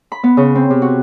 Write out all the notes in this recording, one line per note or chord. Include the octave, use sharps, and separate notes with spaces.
B5
B3
C#3
C4
C3
F#4